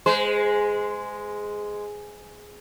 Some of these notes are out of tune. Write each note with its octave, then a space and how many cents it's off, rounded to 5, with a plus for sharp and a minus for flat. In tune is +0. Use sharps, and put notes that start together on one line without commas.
G#3 +0 C5 -35